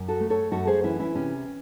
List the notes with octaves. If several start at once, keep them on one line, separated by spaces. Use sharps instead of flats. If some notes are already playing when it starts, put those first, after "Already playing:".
Already playing: F#2
F#4 A4
A3
A4 C#5
F#2 F#4 A4
G#4 C5
E3 C#4 E4
C#4 E4
C3 C#4